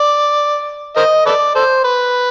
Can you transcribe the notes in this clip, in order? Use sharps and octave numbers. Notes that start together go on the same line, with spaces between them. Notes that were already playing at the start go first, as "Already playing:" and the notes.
Already playing: D5
A#4 C5 D#5
A4 B4 D5
A4 C5
B4